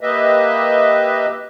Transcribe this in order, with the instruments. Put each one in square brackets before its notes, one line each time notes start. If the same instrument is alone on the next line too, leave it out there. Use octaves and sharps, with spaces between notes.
[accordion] A#3 G4 B4 D#5 E5